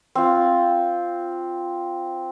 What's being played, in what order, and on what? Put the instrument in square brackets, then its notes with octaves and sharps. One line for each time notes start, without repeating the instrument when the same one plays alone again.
[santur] C4 F4